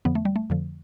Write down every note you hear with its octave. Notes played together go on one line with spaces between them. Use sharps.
F2 D3 F3 B3
A3
G3
A3
F2 D3 F3